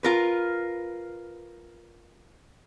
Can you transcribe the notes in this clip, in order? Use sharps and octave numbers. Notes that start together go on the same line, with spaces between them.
F4 A#4 B4